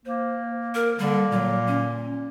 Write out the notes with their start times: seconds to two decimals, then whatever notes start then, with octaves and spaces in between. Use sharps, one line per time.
0.05 A#3 C5
0.75 A#4
0.99 D3 G3 A#3
1.31 A#2 F#3
1.67 C#4